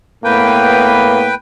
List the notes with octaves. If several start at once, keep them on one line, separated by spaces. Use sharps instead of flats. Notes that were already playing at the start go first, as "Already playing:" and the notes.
A2 A#3 B3 B4 G5